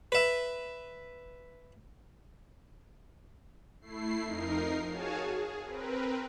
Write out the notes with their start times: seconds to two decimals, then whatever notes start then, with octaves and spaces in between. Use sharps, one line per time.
0.12 B4 E5
3.81 A3 E4 C7
4.24 F2 D#4 A#4 C7
4.89 F#4 G#4 C#5 F5 G#5 A5
5.30 G#4
5.65 C4 A#4 B4